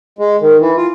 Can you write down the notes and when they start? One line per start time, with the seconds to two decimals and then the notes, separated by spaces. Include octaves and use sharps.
0.19 G#3
0.41 D#3
0.60 E3
0.77 F4